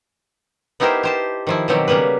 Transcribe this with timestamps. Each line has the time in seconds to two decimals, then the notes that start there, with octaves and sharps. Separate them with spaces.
0.80 B3 D#4 E4 G4 A#4 C5
1.03 G4 C5 A5
1.47 D#3 F3 E4
1.68 B2 D#3 F#3 C4 G4
1.88 C#3 G3 A#3 B3 B4